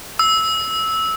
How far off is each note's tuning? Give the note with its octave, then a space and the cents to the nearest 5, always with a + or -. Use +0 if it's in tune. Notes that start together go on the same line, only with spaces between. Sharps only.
E6 -15